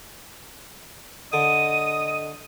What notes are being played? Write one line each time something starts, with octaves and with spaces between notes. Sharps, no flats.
D3 D#5 D#6 D#7